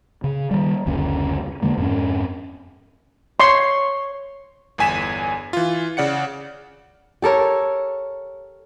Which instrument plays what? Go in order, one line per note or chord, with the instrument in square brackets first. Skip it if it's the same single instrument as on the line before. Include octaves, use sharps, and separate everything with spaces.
[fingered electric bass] C#3
D#3 G3
F#1 D2 C#3 C#4
E2 D3 G#3 A#3
F2 G#2 C#4
[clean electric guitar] C#5 [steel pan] C6
[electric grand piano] G1 E2 G#5 B6 E7
E3 F4
C#3 D5 F#5 C#7
[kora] G4 A4 A#4 C#5